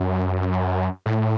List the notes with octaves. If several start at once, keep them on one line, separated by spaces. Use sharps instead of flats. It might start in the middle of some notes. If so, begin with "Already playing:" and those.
Already playing: F#2
A2